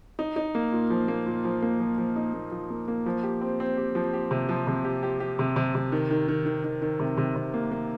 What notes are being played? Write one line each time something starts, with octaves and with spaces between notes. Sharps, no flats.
D#4
D#4
A#3
A#2
F3
A#3
A#2
F3
A#3
F3
F3
D#4
A#3
F3
A#3
A#3
F3
G4
C4
C4
G4
F3
G4
C3
F3
C3
G4
G4
G4
C3
C3
C3
D#3
D#3
D#3
D#3
D#3
D#3
C3
C3
C3
A#3
A#3